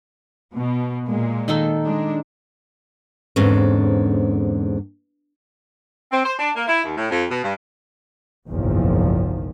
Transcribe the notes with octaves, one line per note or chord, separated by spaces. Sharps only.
B2
A#2 G#3 A#3
D#3 D#4 A4
G#3 D4
E2 G#2 D3 C4 C#4
C4
C5
D4
A#3
E4
D#2
A2
F2
B2
G2
F#1 B1 E2 G#2 D#3 F3